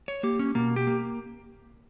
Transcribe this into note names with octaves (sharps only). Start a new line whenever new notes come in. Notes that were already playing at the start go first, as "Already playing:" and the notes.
C#5
A#3 G4
C#4
B2 A#3
G4
A#3